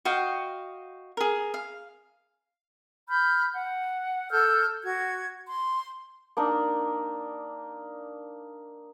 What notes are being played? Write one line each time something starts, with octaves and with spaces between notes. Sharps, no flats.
F#4 D#5 F5 G5
G#4 A#4
F5
B5 F6 G6
F#5
A4 E6 F6 G6
F#4 G#6
C6
A#3 D4 D#4